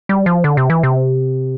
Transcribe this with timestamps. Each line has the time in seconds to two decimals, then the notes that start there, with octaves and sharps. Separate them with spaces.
0.09 G3
0.26 F3
0.44 D3
0.57 C3
0.70 E3
0.83 C3